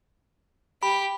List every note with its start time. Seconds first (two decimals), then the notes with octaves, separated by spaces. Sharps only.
0.83 G4 B5